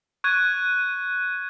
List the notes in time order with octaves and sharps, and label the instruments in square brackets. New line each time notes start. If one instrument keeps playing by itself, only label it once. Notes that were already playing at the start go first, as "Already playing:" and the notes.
[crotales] C#6 F#6 G#6 D#7